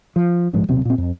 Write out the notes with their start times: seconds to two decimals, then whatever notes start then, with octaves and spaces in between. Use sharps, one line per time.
0.16 F3
0.53 A#1 G#2 F3 G#3
0.68 D#1 B1 C3 C4
0.85 A#2 C4
0.98 F2